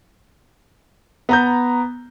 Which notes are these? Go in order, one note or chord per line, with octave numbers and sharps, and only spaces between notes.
B3 A#5 G6